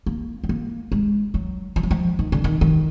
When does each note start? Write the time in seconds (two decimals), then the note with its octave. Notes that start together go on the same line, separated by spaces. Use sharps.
0.06 A#3
0.44 B3
0.49 A#3
0.92 G#3
1.34 F#3
1.76 F3
1.83 F#3
1.91 F3
2.19 D#3
2.32 D3
2.44 D#3
2.61 D#3